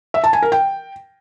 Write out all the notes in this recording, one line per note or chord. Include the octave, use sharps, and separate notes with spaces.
E5
A5
G#5
A#4
G5